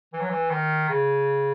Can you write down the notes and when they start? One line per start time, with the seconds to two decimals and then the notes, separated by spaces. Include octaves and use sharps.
0.13 E3
0.20 F#3
0.30 E3
0.50 D#3
0.89 C#3